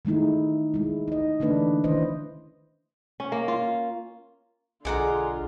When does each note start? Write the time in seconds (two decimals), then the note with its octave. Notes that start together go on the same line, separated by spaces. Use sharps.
0.05 D#3 G#3 A3 D#4 E4
0.74 G#3 E4
1.08 D#4 D#5
1.40 D3 E3 A3 A#3 D4 B4
1.84 D#3 C#4 E4 B4 C5 D#5
3.20 C#4
3.32 A#3
3.48 F4
4.85 B1 D3 G#3 F4 G#4 D5 F#5 A#5